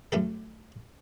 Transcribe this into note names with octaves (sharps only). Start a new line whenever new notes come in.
F#2 A3 G4 A4